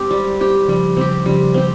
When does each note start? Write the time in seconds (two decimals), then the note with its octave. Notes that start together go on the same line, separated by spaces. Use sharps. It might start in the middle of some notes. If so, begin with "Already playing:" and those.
Already playing: G#3 C4 G4
0.11 G3
0.40 C4 G4
0.68 C#3 F3 G3
0.97 C#3 F3 C4 G4
1.26 C#3 F3 G3
1.54 C4 G4